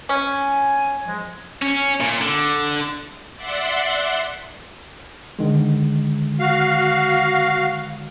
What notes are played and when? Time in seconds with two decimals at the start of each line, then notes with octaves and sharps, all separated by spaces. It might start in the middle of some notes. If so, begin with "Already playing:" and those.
0.09 C#4 G#5
1.06 F3 G#3
1.62 C#4
2.00 A#2
2.21 D3
3.35 D5 E5 F#5 C6
5.39 D3 D#3 G#3
6.40 F#4 F5